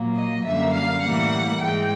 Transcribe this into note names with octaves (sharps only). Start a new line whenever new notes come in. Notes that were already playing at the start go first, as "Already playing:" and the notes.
Already playing: A#2 F#3 A#3
D#5
F#2 D3 G3 A#3 E5
F5
A2 E3 G3 A#3 F#5
G#2 E3 G#3 G5